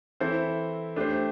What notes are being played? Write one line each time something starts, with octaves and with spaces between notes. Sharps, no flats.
E3 C4 E4 A4 C5
A3 D4 G4 C5